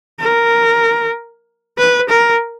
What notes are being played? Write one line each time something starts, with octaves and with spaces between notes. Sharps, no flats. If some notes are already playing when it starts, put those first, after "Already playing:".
A#4
B4
A#4